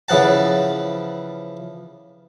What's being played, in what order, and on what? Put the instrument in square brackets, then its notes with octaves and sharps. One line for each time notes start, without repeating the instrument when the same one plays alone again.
[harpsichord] C#3 E3 F3 F#5 A5